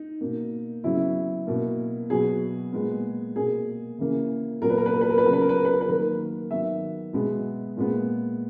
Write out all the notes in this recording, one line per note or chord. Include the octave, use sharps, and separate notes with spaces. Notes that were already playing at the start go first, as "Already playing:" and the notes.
Already playing: D#4
B2 A#3
C#3 F#3 B3 E4
B2 A#3
B2 F#3 B3 G#4
A#2 G#3 B3
B2 A#3 G#4
C#3 E3 A#3
A#2 F#3 B3 A#4
B4
A#4
B4
A#4
B4
A#4
B4
C#3 F#3 B3 A#4
B4
A#4
B4
A#4
B4
A#4
B4
D#3 F#3 A#3 A#4
D#3 F#3 B3 E5
B2 G#3 B3
A#2 G#3 B3